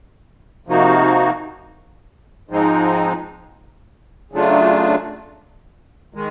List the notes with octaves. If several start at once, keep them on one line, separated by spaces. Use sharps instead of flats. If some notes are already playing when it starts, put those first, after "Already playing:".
C3 F3 A#3 D#4 F#4
G#2 F3 G#3 C4 D#4
C#3 F#3 A3 D4 F4
D#3 G#3